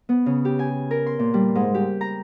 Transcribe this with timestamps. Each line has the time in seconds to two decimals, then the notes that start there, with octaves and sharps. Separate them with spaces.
0.09 B3
0.26 C#3
0.45 G4
0.59 G#5
0.91 A#4
1.06 C6
1.19 A#2
1.34 G3
1.55 G#2
1.74 G4
2.01 A#5